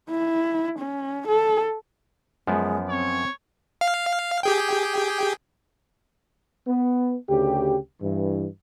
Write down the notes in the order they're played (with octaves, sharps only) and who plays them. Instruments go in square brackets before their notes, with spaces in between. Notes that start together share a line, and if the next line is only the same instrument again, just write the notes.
[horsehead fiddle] E4
C#4
A4
[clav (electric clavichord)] F#2 F3 B3 [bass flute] G#3
[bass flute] C4 [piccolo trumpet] C#5
[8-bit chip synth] F5
G4 G#4 G5
[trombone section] B3
D2 C#3 G4
G2 E3